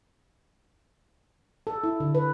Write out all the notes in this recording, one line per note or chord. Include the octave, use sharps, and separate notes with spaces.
A4
E4
D3
B4